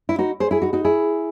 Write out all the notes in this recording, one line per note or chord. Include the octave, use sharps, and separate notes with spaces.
E4
D#4 F#4
G#4 C5
E4 G#4
D#4 F#4
D#4 F#4
E4 G#4